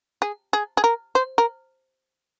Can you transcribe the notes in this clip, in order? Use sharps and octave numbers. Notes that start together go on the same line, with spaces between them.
G#4
G#4
G#4
A#4
C5
A#4